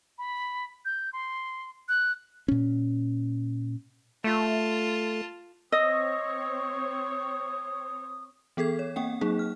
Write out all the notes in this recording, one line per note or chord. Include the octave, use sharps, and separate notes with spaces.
B5
G6
C6
F#6
A#2 C#4
A3 F4 A5
C4 C#5 D#5 D#6 E6 A#6
E3 B3 G#4 A4 G#6
C#5
A#3 C4 F#5 G5
F#3 A#3 D#4 G#4
F6